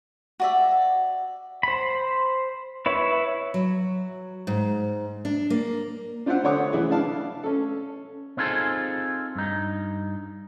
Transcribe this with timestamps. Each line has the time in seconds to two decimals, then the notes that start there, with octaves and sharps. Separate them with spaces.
0.40 F#4 D5 E5
1.63 C5 B5
2.86 E4 B4 C#5 E5
3.54 F#3
4.47 G#2
5.25 D4
5.50 A#3
6.26 D4 F4 C5 D5 E5 F#5
6.44 D3 C5 C#5 F#5 D6 D#6
6.72 E3 E4 G#4
6.90 D4 E4 F5 A5
7.43 C#4 A4
8.37 C4 D#4 F4 G#4 A4
9.36 G2 D#4